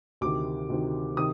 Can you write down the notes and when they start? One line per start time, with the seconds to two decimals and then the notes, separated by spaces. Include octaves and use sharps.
0.21 D2 C3 D#3 D6
0.70 D2 C3 D#3
1.17 C3 D#3 D#6